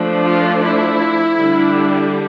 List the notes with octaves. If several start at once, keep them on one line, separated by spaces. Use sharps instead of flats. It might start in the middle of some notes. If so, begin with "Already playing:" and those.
Already playing: F3 A3 D4
F4
E4
D3 G3 D4